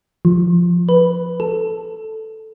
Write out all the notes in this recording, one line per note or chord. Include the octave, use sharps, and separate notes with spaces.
F3
B4
A4